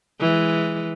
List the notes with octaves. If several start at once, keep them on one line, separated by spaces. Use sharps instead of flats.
E3 G#3